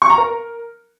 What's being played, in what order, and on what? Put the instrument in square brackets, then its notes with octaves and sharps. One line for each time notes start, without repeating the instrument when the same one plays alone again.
[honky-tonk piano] C#6
A#5
A#4